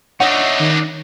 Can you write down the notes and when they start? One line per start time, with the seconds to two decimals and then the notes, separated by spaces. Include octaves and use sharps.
0.20 D4 D#4 C#5 D#5 E5 F#5
0.60 D#3